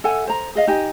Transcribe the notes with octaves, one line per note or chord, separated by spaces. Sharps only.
A4 E5 F#5 G#5
C5 A#5
G#4 D#5 F5
D#4 G4 D#5 G#5